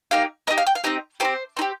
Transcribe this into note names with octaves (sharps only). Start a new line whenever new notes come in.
A#3 D#4 G4 F5
A#3 D#5
D#4 G4
F5
G5
F5
C4 D#4 G4 D#5
C4 D#4 G4 C5
C4 D#4 G4